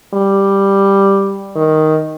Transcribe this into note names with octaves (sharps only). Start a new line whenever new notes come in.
G3
D#3